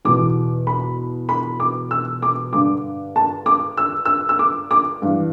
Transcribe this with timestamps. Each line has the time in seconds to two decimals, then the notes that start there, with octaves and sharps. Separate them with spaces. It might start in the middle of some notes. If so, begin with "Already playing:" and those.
0.05 E2 B2 D6
0.67 B5
1.29 B5
1.60 D6
1.91 E6
2.22 D6
2.53 G2 D3 D6
3.16 A5
3.46 D6
3.77 E6
4.05 E6
4.29 E6
4.39 D6
4.71 D6
5.02 G2 E3